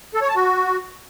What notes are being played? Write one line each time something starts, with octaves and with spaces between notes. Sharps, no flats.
A4
C#5
A5
F#4